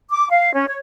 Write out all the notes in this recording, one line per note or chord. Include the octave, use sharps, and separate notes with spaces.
D6
F5
C#4
C#5